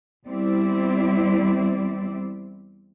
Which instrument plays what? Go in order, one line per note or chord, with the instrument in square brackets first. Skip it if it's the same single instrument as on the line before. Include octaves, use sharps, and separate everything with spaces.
[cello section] E2 G3 C4 E4 D5